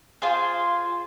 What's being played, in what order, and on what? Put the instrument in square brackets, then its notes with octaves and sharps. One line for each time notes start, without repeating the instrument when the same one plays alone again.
[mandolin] F4 G#4 C5